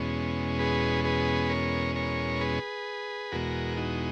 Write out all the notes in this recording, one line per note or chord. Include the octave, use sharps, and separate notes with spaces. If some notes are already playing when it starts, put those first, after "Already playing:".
Already playing: E2 B2 G#3 C#4
G#4 B4
G#4 B4
A#4 C#5
A#4 C#5
G#4 B4
E2 B2 G#3 F#4 A#4
D#4 F#4